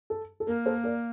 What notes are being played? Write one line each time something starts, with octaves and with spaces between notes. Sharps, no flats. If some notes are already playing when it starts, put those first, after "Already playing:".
A4
A4
A#3 A#4
A4 C5
A#4 D5